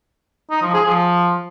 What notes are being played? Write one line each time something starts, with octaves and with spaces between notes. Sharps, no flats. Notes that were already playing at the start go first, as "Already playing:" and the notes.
D#4
F3
G#4
F3